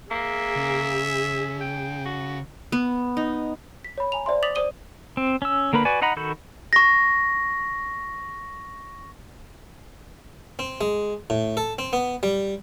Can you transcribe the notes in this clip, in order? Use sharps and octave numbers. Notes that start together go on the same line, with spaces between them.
A#3 G#4 E5
C#3
G5
F#4
B3
D#4
B6
C#5 B5
G#5 A#5 F7
C5 D5 E5 C6
D6 D#6 A6 B6 F7 F#7
C5 D5 D#6 D#7 G7
C4
C#4 E6
D3 A#3 A#4 B4 B5
F#4 B4 D5 G#5
D#4 D#5 F#5 A#5 B5
D#3 F#4 A4 B5 G6
C#6 A#6
C4
G#3
A2
A4
C4
B3
G3